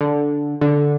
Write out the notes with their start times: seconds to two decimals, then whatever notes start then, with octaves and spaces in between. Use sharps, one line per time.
0.01 D3
0.61 D3